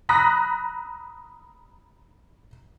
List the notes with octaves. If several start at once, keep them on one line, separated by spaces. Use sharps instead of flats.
A#5 B5 D#6 F#6 A#6 B6